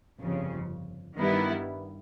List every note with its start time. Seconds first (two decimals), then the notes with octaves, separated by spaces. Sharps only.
0.19 G1 F2 C#3
1.17 G2 D#3 G3 B3 E4